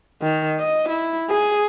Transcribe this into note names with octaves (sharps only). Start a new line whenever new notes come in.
D#3
D#5
E4
G#4